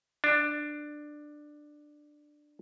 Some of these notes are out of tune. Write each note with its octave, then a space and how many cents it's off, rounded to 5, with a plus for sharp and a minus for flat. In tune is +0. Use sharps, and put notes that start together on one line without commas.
D4 +15